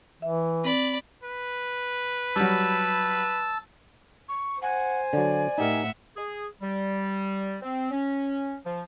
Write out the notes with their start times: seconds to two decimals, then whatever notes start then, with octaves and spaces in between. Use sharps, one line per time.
0.22 E3 E5
0.64 C4 D5 B5
1.24 B4
2.36 F#3 G3 A5 E6
4.28 C#6
4.62 C5 F#5 G#5
5.13 D3 F#3 D5
5.58 A2 D#4 G4 A#4 E5 F#5
6.17 G#4
6.61 G3
7.61 C4
7.91 C#4
8.66 F3